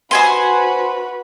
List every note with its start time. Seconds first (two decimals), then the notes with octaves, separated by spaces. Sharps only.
0.11 F#4 B4 C5 G#5 C6